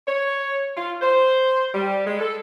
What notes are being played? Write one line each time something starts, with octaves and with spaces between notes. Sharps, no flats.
C#5
F4
C5
G3
G#3
A4